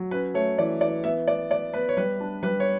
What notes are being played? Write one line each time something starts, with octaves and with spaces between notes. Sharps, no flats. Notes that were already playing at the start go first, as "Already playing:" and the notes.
Already playing: F#3
C#4 B4
A3 C#5
E3 D5
E3 D5
B3 E5
B3 D5
B3 D5
B3 B4
C#5
G3 B4
D4
G3 B4
C#5